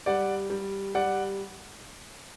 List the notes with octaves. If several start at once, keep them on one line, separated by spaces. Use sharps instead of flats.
G3 D5 F#5
G3
G3 D5 F#5